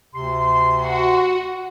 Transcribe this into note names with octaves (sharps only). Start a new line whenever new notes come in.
D2 C3 C6
F#4